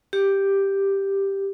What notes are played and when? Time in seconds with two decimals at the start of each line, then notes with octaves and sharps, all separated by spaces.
0.13 G4